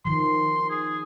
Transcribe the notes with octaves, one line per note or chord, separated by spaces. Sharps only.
D#3 F3 C6
G#4